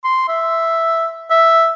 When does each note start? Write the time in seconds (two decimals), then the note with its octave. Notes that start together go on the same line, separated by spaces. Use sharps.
0.04 C6
0.28 E5
1.30 E5